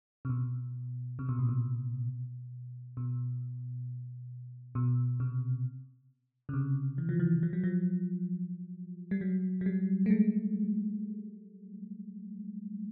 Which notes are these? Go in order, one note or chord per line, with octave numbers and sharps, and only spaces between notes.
C3
B2
C3
B2
A#2
B2
B2
B2
C3
C#3
C3
E3
F3
E3
F3
F#3
F3
G3
F#3
F#3
G3
A3
G#3